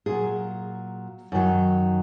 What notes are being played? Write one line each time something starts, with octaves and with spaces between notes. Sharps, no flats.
A#2 F#3 G#4
F#2 D#3 F#3